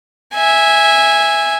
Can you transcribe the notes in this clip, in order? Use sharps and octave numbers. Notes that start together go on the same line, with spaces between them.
E5 G#5